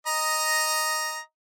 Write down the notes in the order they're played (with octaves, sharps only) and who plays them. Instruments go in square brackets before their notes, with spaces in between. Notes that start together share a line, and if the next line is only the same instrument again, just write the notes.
[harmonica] D#5 A#5